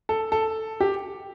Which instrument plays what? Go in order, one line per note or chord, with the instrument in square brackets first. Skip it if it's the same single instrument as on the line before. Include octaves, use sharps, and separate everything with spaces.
[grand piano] A4
A4
G4